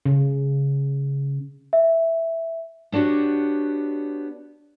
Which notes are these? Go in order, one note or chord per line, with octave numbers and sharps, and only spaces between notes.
C#3
E5
B3 D4 F#4 G4 C#5